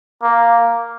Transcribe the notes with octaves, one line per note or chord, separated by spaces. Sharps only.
A#3